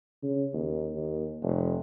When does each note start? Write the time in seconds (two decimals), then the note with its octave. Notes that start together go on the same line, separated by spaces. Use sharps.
0.23 C#3
0.53 D#2
0.95 D#2
1.42 F1